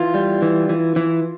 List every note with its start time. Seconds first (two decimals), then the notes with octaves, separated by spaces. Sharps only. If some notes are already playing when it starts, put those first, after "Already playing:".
Already playing: E3 F4
0.14 G3
0.42 E3
0.69 E3
0.96 E3